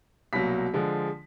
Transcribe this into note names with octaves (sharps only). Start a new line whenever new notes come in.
C2 B2 F#3 A#3 B6
D3 F3 G#3